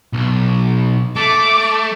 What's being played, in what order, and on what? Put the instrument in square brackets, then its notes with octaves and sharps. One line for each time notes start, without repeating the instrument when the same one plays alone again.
[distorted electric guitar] B1
[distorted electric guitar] A3 [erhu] D6